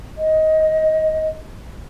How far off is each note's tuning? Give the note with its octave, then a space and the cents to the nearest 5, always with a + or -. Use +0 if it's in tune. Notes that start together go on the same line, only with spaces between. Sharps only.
D#5 +15